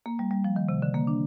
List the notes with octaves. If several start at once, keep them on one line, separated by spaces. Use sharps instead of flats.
A#3
G3
G3
F3
D#3
C3
D3
A#3
D4